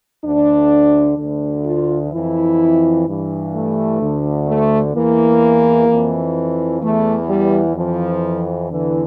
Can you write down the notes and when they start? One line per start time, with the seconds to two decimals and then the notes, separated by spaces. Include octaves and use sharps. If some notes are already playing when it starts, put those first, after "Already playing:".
0.24 D2 D3 D4
1.18 D2 D3
1.65 F4
2.12 F2 E3 E4
3.07 G2 E3
3.54 A3
4.00 D2 D3
4.47 A3
4.94 E2 E3 A#3
5.88 F2 E3
6.82 E2 E3 A3
7.29 G3
7.76 F2 E3 F3
8.71 E2 D3 E3